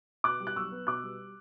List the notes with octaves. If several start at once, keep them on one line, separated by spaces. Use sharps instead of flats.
B2 D6 F#6
G3
F#6
B1 C#6 E6
B3
B2 D6 F#6
G3